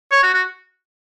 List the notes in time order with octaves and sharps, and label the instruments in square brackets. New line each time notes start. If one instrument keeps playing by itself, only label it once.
[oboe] C#5
F#4
F#4